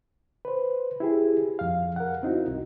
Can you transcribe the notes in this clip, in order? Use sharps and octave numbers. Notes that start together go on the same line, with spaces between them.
B4 C5
E4 G4 G#4
F2 F5
A#4 F#5
C4 D#4 E4 F#4
C2